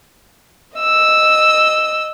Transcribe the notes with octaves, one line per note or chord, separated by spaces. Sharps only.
D#5 E6